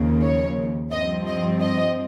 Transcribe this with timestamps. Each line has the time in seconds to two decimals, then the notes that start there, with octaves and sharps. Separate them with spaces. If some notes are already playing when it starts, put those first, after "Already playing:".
Already playing: D#2 C#3 F3 A#3
0.22 C#5
0.92 G2 F3 C4 D#5
1.27 D#5
1.61 D#5